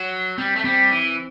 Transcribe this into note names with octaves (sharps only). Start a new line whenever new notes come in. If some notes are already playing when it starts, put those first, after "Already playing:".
Already playing: F#3
G3 C4
A3
G3 C4
E3